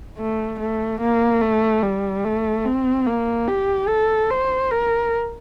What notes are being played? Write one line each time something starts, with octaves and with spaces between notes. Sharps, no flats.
A3
A3
A#3
A3
G3
A3
C4
A#3
G4
A4
C5
A#4